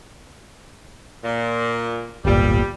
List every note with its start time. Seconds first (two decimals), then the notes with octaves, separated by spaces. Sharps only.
1.23 A#2
2.25 D1 G1 A#2 G3